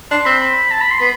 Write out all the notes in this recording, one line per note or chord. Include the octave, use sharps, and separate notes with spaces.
D4 C6
C4 B5
B5
A5
B5
C6
B3 B5